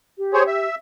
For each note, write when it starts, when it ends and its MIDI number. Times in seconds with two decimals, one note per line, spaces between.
0.18 0.67 67
0.34 0.43 68
0.34 0.43 72
0.34 0.43 73
0.47 0.75 76